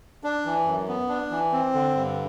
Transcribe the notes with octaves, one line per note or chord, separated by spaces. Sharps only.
D4
E3
F#2
B3
D4
E3
C4
D3
G2